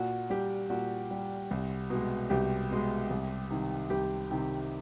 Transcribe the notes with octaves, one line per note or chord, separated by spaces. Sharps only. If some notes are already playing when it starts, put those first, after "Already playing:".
Already playing: A#2 F#4
G3 G4
A#2 F#4
G3
C2
B2
G#3
C2 G4
B2 G#3
C2
C3 D#3
C2 G4
C3 D#3